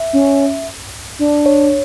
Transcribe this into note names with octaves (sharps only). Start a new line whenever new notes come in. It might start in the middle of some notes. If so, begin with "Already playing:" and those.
Already playing: E5
C#4
D4
C#5